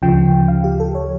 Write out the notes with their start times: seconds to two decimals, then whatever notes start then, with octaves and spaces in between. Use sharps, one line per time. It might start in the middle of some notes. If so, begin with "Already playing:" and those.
0.02 D2 C#3 F3 G5
0.48 F5
0.64 G4
0.80 A4
0.95 C#5